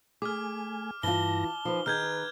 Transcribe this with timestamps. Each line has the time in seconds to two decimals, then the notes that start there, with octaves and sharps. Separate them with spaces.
0.22 A3 G#4 G#5 D6 F6
1.03 G2 E3 F4 A5 A#6 G7
1.65 F3 D#4 B4
1.86 D#3 G#4 B4 F6 G6 G#6